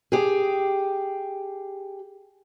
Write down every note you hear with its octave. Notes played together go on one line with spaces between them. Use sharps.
G4 G#4